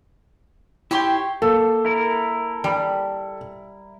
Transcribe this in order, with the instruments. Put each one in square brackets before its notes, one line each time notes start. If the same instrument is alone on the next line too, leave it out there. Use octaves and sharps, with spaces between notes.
[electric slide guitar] E4 G5 [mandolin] G4 C#5 C6
[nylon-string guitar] A#3 [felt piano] A4
[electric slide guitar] E4 A#4
[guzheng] G3